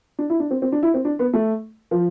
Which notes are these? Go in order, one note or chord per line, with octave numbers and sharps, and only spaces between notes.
D4
E4
D4
C4
C4
D4
E4
C4
D4
B3
A3
F3